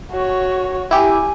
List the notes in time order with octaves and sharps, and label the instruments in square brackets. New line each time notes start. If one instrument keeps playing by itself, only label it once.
[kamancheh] F#4 C#5
[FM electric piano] E4 G4 [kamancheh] G#5